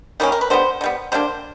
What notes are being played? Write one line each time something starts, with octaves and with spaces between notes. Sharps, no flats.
D#3 G3 A#3 C#4
A#4
B4
D3 G3 B3 C5
D3
G3 B3
D3 G3 A#3 D4 C5